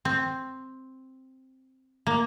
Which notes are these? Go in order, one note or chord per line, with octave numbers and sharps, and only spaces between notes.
C4
A#3